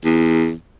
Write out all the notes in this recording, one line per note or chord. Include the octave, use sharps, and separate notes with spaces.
E2